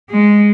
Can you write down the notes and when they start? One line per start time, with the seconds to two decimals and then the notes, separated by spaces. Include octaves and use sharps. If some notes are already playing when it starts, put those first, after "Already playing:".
0.10 G#3